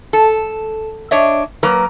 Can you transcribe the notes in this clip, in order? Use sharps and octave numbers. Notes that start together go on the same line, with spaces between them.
A4
D4 C#5 D#5 E5
F#3 A#3 A#4 B4 A#5